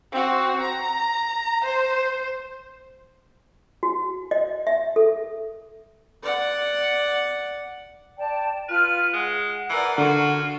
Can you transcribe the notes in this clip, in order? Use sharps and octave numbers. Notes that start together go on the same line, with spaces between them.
C4 F#4
A#5
C5
F#4
D#5
E5
A4
D5 F#5
D5 G5 A5
F4 B4 F6
G#3 F#5
E3 A#4 D5
D3 F4 F#4